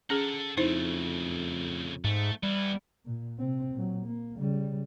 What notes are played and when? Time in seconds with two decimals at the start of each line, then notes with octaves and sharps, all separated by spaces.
0.10 C#4 G#4 A4 F#5
0.57 F2 C#3 A3 D#4 E4 C5
2.04 G#2 A3
2.43 E3 G3 B3
3.05 A#2
3.38 C3 C4
3.74 A#2 F#3
4.06 A#3
4.38 C#3 G3